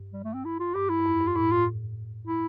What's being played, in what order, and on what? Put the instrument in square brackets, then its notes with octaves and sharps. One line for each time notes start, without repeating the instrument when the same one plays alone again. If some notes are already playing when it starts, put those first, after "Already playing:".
Already playing: [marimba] G2
[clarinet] G3
A3
C4
E4
F4
[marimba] G2 [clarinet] G4
[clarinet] E4
[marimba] G2
F2
G2
[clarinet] F4
[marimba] A2 [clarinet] E4
[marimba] A2 [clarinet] F4
[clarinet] E4